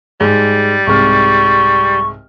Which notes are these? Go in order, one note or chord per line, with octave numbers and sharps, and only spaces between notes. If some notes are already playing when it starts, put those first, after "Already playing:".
G#2 G3
C2 G#2 C#6 F6